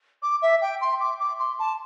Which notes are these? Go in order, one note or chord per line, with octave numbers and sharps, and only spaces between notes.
D6
E5
G5
C6
D6
D6
C6
A5